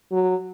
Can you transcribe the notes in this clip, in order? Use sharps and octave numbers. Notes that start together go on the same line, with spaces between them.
F#3